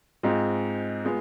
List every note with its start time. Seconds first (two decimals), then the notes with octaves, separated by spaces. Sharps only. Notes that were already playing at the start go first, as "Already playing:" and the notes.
0.23 G#2 G#3 C4 F4
1.04 G#3 B3 F4